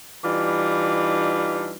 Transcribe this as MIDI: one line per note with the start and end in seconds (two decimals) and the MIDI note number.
0.24 1.76 52
0.24 1.76 55
0.24 1.76 62
0.24 1.76 63
0.24 1.76 65